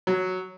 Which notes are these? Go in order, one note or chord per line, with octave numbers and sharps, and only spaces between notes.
F#3